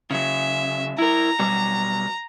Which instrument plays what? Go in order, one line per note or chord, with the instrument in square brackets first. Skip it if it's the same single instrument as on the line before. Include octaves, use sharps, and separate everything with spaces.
[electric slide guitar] C#3 F#3 [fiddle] E5
[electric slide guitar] E4 A#4 [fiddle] A#5
[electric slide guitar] B2 F#3 G3